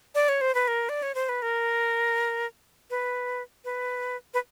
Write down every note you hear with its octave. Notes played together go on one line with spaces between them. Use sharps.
D5
C#5
C5
B4
A#4
D5
C#5
C5
B4
A#4
B4
B4
B4